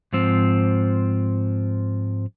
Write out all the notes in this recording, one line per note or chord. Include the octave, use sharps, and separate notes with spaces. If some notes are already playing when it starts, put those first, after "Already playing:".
G#2 F3 C4